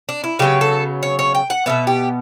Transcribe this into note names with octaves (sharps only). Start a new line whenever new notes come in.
D4
E4
C#3 F#3 B3 G4
A4
C#5
C#5
G5
F#5
B2 G3 B3 E5
G4